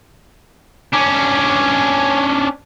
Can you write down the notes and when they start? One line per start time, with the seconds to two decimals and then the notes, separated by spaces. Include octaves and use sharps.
0.93 C#4 D4